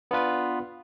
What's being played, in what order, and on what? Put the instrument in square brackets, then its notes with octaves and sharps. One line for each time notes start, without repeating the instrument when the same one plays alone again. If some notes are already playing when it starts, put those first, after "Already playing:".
[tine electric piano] B3 D4 F4 B4